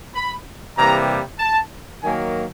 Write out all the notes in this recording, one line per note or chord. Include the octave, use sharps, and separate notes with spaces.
B5
C3 E3 G3 A#3 A#5
A5
D#3 F#3 A#3 G#5